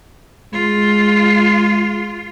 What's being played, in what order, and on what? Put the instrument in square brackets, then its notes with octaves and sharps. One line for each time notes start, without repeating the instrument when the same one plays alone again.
[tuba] G#3 [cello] F4